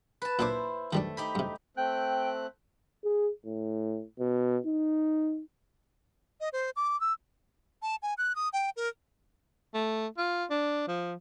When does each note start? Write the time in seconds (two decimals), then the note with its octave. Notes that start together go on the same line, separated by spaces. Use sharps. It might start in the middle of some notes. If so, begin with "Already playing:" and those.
0.22 B4 A5
0.39 A#2 D4 E4 C5 D6
0.93 D#3 G3 A3 D4
1.17 D#4 G4 B5
1.35 G2 C3
1.77 A3 C4 G5 F#6
3.04 G#4
3.46 A2
4.19 B2
4.66 D#4
6.41 D#5
6.53 C5
6.76 D6
7.01 E6
7.82 A5
8.02 G#5
8.18 F#6
8.36 D#6
8.53 G5
8.76 A#4
9.74 A3
10.18 F4
10.50 D4
10.88 F3